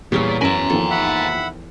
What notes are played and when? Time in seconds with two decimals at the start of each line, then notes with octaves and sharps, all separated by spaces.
0.12 E2 A#2 G3 C#4 C#5
0.41 F#2 A#4 E5 G#5 A#5 B6 F#7
0.70 D#2 F3 A4
0.90 E5 F#5 B5